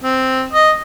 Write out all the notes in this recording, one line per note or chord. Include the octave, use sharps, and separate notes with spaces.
C4
D#5